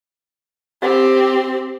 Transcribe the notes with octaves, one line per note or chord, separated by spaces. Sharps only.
C4 G4